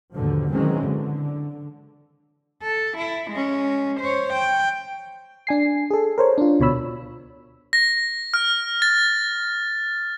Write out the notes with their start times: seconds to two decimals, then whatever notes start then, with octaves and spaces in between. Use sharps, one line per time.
0.13 D#2 G#2 B2 D3 F3
0.51 D#3 E3 F#3 G#3 C4 C#4
0.81 D3
2.62 A4
2.97 E4
3.31 G#3 C#4
4.00 C5 C#5
4.33 G5
5.47 D4 G#5 C7
5.91 G#4 A4
6.18 A#4 C5 C#5
6.38 D4 F4
6.60 D2 B2 C#5 B5 E6
7.73 A#6
8.34 F6
8.82 A6